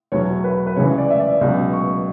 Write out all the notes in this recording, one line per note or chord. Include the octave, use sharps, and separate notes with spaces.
E2 B2 F#3 C#5
B4
B4
C#2 C#3 E3 C#5
D5
E5
D5
C#2 B2 F#3
C#6